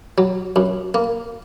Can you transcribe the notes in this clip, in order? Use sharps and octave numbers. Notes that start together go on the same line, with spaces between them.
F#3
F#2
A#3